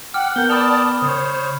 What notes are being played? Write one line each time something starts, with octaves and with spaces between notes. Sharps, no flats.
F#5 G5 D6 F6
B3 A#4 G5 G6 G7
D5 A5 B5 D#6 F6 F7
C#3 C5 C#5